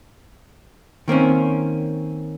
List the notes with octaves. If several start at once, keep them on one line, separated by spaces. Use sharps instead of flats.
D#3 A#3 C4 C#4